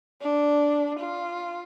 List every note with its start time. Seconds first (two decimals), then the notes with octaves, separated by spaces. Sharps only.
0.21 D4
1.00 F4